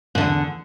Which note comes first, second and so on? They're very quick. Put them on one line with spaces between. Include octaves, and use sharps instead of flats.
G#2 D3 E2